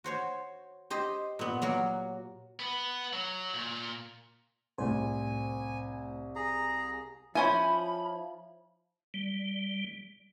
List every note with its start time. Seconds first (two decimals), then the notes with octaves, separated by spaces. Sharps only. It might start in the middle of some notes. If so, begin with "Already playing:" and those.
0.04 F#4 C5 C#5
0.90 G4 C5 D#5
1.39 A#2 B3
1.62 F#3 A#3 F#4
2.60 B3 B4
3.13 F#3
3.54 A#2
4.78 C2 A2 C5 G#5
6.35 G#4 A#5
7.35 F3 C#4 E4 C5 G#5 B5
9.14 G3